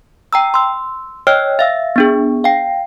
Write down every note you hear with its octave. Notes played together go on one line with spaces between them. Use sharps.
G5 A#5 E6
C6 E6
C#5 D#5 G5 E6 F6
E5 F5 E6
B3 D4 G#4
F5 G5